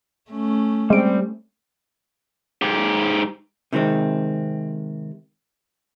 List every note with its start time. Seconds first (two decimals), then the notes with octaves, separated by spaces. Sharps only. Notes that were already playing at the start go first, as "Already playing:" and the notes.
0.31 A3 C#4
0.90 G3 G#3 C4 D7
2.62 G#2 G4
3.73 C3 D#3 G#3 C4